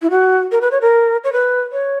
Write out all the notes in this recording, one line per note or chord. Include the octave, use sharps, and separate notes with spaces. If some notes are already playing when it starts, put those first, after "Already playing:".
E4
F#4
A#4
B4
C#5
A#4
C#5
B4
C#5